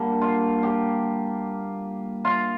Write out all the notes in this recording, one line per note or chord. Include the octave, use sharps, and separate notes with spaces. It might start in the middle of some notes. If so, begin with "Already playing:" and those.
Already playing: D3 G3 A#3
F4
G4
F4